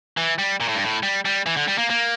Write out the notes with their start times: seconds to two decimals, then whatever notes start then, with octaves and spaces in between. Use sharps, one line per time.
0.17 E3
0.39 G3
0.60 A#2
0.68 A2
0.75 G2
0.84 A2
1.03 G3
1.25 G3
1.46 E3
1.57 D3
1.68 G3
1.78 A#3
1.90 A#3